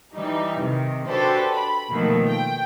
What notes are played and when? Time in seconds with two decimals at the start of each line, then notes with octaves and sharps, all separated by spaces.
0.15 E3 G3 D#4
0.59 C3 D#3
1.08 D4 F#4 G4 A4 B4 C5
1.52 B5
1.92 B2 D#3 F3 A3 A#3
2.28 G5